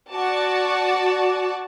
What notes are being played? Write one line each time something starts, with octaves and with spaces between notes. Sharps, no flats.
F#4 D5 A5